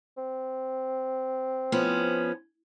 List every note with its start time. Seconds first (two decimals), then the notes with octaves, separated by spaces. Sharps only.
0.17 C4
1.72 F3 B3 C#4